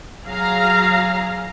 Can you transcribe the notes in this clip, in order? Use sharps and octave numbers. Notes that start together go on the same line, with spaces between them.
F#3 G#4 F5 A#5